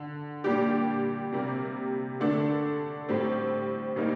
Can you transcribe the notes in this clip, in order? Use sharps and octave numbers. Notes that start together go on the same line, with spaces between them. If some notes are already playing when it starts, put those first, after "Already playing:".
Already playing: D3
A#2 G3 D4 G4
C3 G3 A#3
D3 A3 D4 A4
A2 G3 C4
A#2 G3 A#3 D#4